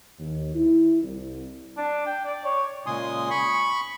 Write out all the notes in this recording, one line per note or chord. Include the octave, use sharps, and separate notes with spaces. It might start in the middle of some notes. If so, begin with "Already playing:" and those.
D#2
E4
C2
D4
G5
D5
C#5
A#2 C#3 G#3 G#5 C6 D#6
B5 C#6